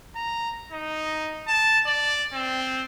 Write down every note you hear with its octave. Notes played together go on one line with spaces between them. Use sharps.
A#5
D#4
A5
D5
C4